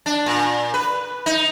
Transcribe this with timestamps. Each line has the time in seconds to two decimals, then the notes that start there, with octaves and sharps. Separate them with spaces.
0.06 D4
0.26 A#2
0.74 B4
1.26 D#4